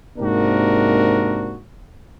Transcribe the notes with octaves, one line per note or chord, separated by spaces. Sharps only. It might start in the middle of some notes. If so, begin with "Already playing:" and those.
G#2 C3 A#3 D4 F#4 A#4